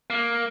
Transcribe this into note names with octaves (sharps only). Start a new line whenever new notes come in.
A#3